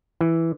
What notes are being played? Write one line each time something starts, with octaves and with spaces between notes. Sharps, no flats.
E3